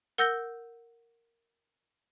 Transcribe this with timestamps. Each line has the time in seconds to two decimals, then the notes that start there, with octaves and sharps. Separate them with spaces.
0.18 A#4 F#5 E6 G6 A#6 G7